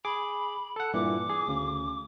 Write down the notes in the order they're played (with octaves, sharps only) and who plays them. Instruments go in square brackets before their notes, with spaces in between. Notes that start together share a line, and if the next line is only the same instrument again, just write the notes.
[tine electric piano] G#4 D6 [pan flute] B5
[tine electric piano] A4 F#5
[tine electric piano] G2 A#2 E3 [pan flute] D6
[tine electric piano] G#4
D2 C#3